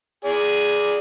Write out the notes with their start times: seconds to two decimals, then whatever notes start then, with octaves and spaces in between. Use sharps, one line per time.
0.25 G#4 D5